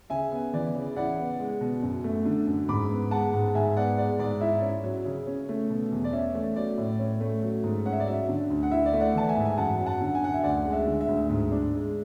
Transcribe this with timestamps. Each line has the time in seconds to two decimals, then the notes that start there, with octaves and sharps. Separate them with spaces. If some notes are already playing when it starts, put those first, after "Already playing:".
0.10 C#3 E5 G#5
0.32 B3
0.53 E3 D5
0.75 C#3
0.96 E4 D5 F#5
1.18 B3
1.39 G#3
1.61 B2
1.83 F#2
2.04 A3
2.25 D3
2.47 F#2
2.69 G#2 B5 D6
2.90 B3
3.11 G#3 F#5 A5
3.34 G#2
3.55 G#2 E5 G#5
3.76 B3 D5 F#5
3.98 G#3 D5
4.19 G#2 D5
4.41 E4 E5
4.62 C#4
4.84 F#3
5.05 C#3
5.27 C#4
5.49 A3
5.70 B2
5.92 E2
6.04 D5
6.13 C#4 E5
6.35 A3
6.56 F#3 D5
6.78 A2
6.99 C#4
7.21 A3
7.43 F#3
7.64 G#2
7.85 C#4 F#5
7.93 E5
8.00 D5
8.07 F#3 E5
8.29 D3
8.50 D2
8.63 F#5
8.71 E4 E5
8.86 D5
8.93 A3 E5
9.00 D5 F#5
9.15 E3 A5
9.29 E5 G#5
9.36 G#2
9.45 G#5
9.57 F#2 F#5 A5
9.79 F#3
9.86 F#5 A5
10.01 D3
10.15 G#5
10.22 F#2 F#5
10.34 E5 G#5
10.43 D2 D5 F#5
10.65 G#3
10.73 E5
10.87 D3
11.01 E5
11.09 D2
11.30 G#2
11.52 D4
11.73 G#3